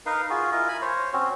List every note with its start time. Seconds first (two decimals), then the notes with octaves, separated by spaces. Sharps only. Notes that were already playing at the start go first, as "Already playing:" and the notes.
0.06 D#4 A#4 B4 F5
0.30 F4 F#4 G#4
0.52 E4 F4 A#4 D#5
0.68 G#5 B5
0.82 C5 C#5
1.13 C4 C#4 F#4